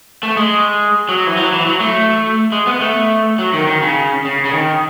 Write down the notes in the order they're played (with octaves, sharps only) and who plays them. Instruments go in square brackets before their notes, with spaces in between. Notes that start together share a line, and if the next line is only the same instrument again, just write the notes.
[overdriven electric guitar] A3
G#3
F#3
E3
F#3
E3
F#3
A3
G#3
B3
A3
F#3
D#3
D#3
C#3
C#3
C#3
D#3